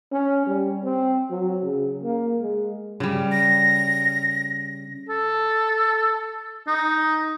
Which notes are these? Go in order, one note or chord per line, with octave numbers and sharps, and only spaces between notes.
C#4
G3
C4
F#3
C#3
A#3
G#3
C#3 G3
A#6
A4
D#4